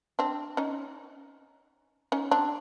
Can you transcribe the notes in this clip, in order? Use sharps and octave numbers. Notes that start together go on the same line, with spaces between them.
C4 D4
C#4 D#4
C#4 D#4
C4 D4